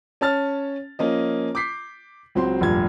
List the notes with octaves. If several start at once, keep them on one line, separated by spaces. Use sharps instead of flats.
C#4 C#5 A5 F6 A6
F3 A#3 C#4 D#5
D6 G6 B6 C7
C#2 F#3 C4 C6
F1 G2 A#2 G#6